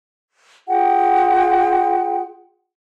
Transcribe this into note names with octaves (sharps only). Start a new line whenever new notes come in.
F4 G#4 F#5 G5